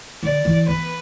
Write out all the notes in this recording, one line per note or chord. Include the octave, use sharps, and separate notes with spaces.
D3 D5
E3
B3 B4